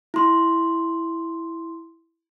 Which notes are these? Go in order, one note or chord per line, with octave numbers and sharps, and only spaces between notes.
E4 C6